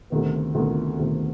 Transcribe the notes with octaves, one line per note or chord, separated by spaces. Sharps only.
D2 C3 D#3 B3
D2 C3 D#3 B3
D2 C3 D#3 B3